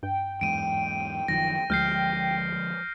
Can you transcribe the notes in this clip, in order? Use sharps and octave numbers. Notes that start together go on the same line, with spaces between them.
G2 G5
E2 G#2 D7 D#7
E1 F#2 D#3 F3 A#6
D2 D3 F3 G#3 F6 G6 C7